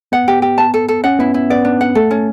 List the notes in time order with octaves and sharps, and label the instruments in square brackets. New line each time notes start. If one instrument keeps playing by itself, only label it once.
[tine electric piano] B3 [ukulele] F#5
[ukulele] G4
G4
A5
A4
A4
[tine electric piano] C#4 [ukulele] F#5
[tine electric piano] B3 [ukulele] E4
[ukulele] E4
[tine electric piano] B3 [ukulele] D5
[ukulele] D4
F#5
[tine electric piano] A3 [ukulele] A4
[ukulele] C#4